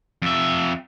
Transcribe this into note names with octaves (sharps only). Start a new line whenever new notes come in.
F2 E5